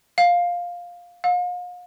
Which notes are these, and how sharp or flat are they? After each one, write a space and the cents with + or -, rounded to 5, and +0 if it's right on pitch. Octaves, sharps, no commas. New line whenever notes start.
F5 +10
F5 +40